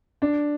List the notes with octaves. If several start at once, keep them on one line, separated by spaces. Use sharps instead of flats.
D4